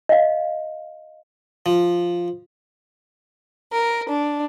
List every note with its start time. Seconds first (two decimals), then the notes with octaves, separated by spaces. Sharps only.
0.09 D#5 F5
1.66 F3
3.72 A#4
4.08 D4